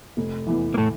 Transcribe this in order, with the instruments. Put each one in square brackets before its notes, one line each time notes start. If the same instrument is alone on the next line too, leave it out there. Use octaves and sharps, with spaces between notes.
[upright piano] F1
E2 E3
[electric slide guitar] A#3
A2 A3